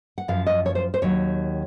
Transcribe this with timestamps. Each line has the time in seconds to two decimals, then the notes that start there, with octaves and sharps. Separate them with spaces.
0.18 F#5
0.28 F#2 F3 F5
0.47 D#5
0.66 C#5
0.75 C5
0.94 C5
1.02 D#2 D#3 F#3 C#5